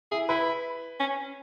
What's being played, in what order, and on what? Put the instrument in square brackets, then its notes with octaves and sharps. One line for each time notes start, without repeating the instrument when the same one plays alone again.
[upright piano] E4 [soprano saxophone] G#4
[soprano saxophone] E4 [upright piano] B4
[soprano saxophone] C#4